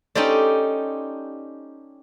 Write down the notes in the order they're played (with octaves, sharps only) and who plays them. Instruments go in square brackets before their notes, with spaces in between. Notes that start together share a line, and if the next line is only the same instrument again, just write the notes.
[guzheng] C#4 D#4 G4 A4 C5 D5